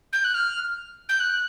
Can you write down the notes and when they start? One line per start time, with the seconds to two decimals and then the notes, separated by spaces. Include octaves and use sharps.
0.13 G6
0.24 F#6
0.34 F6
1.09 G6
1.20 F#6